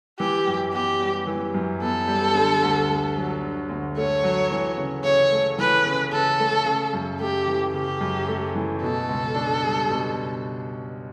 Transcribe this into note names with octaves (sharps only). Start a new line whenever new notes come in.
E3 G4
F#2
B3 G4
G3
E3
F#2
B3 A4
G3
D3
D2
A3
F#3
D3
D2
A3 C#5
F#3
E3
C#3
C#3 C#5
A3
E3 B4
C#3
C#3 A4
A3
C#3
F#2
A3 G4
E3
C#3 G4
F#2
A3
E3
B2 A4
C#2
D4
G3
B2